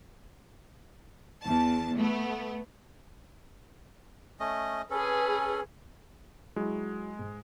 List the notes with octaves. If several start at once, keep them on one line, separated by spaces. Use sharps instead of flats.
E2 A5
A3 B3
A3 C#4 D#5
C#4 G#4 A4 B4
F#3 G#3 E4
G#2